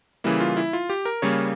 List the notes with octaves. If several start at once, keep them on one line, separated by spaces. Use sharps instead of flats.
C#3 E3 G3 A#3 E4
F4
E4
F4
G4
A#4
C#3 G3 A#3 C#5